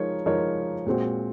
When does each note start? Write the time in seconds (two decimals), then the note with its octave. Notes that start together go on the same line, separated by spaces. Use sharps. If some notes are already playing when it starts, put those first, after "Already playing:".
Already playing: F3 G#3 D#4 A#4 C#5
0.26 F3 G#3 D#4 A#4 C#5
0.86 A#2 G#3 C4 F#4